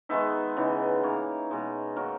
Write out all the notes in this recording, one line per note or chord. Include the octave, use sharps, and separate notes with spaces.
D#3 G#3 B3 D#4 E5
C#3 E3 B3 D#4
E3 A#3 D#4 C#5
B2 G#3 D#4
D#3 F#3 A#3 A#4